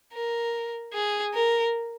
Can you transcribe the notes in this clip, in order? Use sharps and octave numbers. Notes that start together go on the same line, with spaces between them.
A#4
G#4
A#4